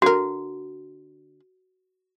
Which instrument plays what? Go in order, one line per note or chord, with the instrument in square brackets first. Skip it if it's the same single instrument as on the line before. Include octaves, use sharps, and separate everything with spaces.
[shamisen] D3 A#4 [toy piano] F#4